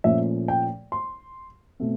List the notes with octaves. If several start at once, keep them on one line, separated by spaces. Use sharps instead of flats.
A#2 F3 A3 C#4 E5
G5
C6
B2 A3 C4